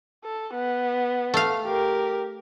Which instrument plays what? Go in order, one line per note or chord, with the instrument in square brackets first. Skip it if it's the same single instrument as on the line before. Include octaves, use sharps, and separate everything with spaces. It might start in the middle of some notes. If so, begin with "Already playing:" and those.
[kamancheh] A4
B3
[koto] A3 F5
[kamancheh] G4 A#4